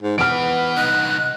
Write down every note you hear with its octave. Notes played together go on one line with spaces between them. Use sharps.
G#2
E3 B3 B4 F6 D7
C2 D#4 F#6